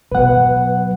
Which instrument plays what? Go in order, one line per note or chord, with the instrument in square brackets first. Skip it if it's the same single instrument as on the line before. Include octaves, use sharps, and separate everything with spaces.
[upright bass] B2 F#3 [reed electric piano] B4 F#5